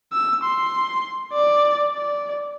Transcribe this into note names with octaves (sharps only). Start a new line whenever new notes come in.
E6
C6
D5
D5